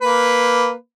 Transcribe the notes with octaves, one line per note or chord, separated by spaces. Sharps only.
A#3 B4